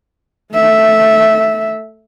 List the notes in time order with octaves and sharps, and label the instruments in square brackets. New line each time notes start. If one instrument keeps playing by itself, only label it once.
[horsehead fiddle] A3 E5